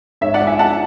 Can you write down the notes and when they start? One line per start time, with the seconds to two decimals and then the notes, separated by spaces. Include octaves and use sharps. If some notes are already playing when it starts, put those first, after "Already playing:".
0.21 G#2 C#5 E5
0.34 D5 F#5
0.41 G#3
0.47 E5 G#5
0.59 G#2 F#5 A5